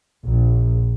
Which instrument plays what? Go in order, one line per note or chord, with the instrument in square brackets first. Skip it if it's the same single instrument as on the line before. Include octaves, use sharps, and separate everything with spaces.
[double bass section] A#1